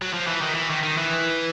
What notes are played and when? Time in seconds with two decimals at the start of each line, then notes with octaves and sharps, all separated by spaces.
0.02 F#3
0.13 F3
0.27 E3
0.41 D#3
0.55 E3
0.70 D#3
0.83 D#3
0.97 E3